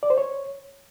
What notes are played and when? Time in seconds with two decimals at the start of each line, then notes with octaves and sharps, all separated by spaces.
0.03 D5
0.10 C5
0.18 C#5